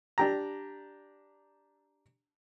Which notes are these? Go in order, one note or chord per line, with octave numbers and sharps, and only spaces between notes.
D4 G4 A#5